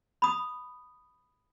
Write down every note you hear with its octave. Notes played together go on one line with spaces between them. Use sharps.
B5 D#6